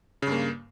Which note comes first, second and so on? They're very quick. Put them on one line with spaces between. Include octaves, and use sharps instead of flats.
C#3 G2 A#3